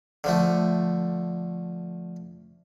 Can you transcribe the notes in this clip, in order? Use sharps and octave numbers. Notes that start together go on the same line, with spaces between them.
D3 F3 A3